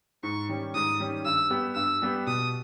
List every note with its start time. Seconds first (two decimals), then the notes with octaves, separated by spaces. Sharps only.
0.23 G#2 C#6
0.49 D#3 G3 C#4
0.75 G#2 D#6
1.00 D#3 G3 C#4
1.25 G2 E6
1.50 G3 B3 G4
1.75 G2 E6
2.02 G3 B3 G4
2.27 B2 D#6